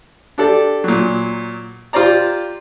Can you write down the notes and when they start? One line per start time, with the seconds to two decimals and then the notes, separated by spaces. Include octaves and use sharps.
0.38 D4 G4 A4 D5
0.84 A#2 F#3
1.93 F4 G4 C5 D5 A#5